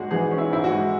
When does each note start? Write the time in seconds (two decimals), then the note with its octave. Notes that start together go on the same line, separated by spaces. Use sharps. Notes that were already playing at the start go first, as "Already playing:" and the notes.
Already playing: G#2 G#3 C#4 F#4 G#4
0.11 E3 G#4
0.31 C#4
0.38 E4
0.50 G#2 E4
0.64 F#4
0.71 G#3